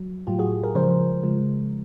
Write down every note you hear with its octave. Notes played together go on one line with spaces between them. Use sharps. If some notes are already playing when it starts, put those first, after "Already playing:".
Already playing: F#3
A2 F#3 F4 G4
F#4 G#4
G#4 A#4
C#3 F3 G#3 A#4 C5
C#3 F3 G#3